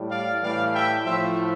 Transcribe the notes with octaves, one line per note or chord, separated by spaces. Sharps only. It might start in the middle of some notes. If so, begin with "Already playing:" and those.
Already playing: A2 G3
D5 F5
A2 E3 G3 D5 F5
E5 G5
A2 F3 A3 C5 E5